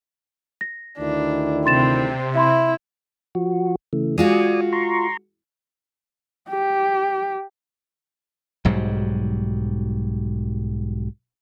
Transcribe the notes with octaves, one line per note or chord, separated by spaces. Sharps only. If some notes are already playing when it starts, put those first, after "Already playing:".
A#6
D2 D#3 D4 E4
C3 C4 C6 A6 E7
E4 E5 B5 C6
F3 F#4
C#3 E3 A3
G#3 F4 F#4 D5 G#5 D#6
A#5 C6 C#6
G4
B1 G#2 F#3 G3